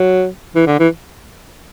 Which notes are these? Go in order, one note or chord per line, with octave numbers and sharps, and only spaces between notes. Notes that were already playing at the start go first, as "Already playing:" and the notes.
Already playing: F#3
E3
D3
E3